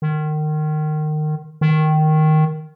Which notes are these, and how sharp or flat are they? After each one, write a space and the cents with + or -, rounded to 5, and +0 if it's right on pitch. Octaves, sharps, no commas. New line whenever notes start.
D#3 -25
D#3 -5